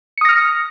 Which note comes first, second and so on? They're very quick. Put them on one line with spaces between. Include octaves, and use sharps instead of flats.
C#7 D#6 A#6 F6